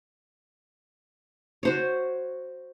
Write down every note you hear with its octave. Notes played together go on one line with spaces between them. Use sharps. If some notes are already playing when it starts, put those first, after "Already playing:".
F#4 C5 C#5